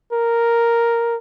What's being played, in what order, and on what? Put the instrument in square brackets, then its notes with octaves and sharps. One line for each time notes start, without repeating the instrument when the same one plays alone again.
[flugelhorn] A#4